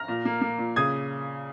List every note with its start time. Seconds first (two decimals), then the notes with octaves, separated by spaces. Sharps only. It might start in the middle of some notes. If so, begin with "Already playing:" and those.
Already playing: F6 A#6
0.08 A#2
0.25 A#3
0.41 A#3
0.59 A#2
0.76 C#3 D#6 G#6